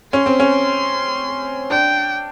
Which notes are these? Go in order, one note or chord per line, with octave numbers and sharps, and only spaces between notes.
C#4 C6
C4
C#4
D4 G5